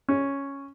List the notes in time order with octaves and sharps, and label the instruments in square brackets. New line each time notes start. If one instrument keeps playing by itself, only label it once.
[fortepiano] C#4